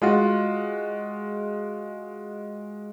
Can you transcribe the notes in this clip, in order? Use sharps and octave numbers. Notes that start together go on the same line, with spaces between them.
G#3 F4 F#4